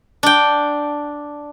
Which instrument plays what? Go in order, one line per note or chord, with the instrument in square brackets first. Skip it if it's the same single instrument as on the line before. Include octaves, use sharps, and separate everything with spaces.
[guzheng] D4 G5